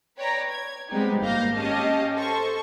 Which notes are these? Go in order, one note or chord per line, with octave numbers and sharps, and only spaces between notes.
B4 C#5 D5 G5 A#5
G#6
G3 G#3 B3 C4 D#4 G4
G#1 A#3 F5 G6 A#6
C#4 G4 D#5 F5 A5
A4 C5 C#6